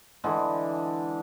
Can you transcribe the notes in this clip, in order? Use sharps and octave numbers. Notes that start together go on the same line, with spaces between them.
D3 E3 G#3